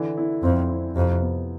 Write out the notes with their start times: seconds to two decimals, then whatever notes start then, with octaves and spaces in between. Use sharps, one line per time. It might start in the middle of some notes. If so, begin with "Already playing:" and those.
Already playing: D3 E3
0.17 E4
0.43 F2 C4
0.69 E4
0.96 F2 C3
1.21 B3